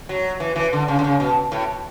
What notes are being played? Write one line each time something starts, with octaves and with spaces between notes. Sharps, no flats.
F#3
E3
E3
D3
C#3
D3
C#3
B2
A2